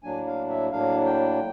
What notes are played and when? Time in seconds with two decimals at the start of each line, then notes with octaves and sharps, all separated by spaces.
0.03 A2 F#3 A#3 D4 G#5
0.27 F5
0.49 E5
0.71 A2 F#3 A#3 D4 F5
1.05 G5